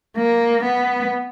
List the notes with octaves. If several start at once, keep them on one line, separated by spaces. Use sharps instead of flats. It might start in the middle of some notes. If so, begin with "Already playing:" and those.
A#3
B3